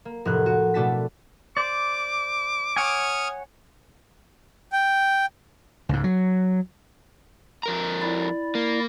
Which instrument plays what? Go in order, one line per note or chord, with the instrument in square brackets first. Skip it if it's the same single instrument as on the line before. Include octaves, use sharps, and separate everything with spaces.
[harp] A#3
F1 A2 A#4 F#6
F#4
B2 A3 D4 F#4 A5 B6
[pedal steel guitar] C5 D5 [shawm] D6
[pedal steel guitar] C#5 F#5 G#5 [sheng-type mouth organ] C#6 D#6 F6
[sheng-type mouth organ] G5
[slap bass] C#2 G#2
F#3
[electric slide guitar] F2 A#4 A#5
[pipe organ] E4 D5
[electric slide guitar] A#3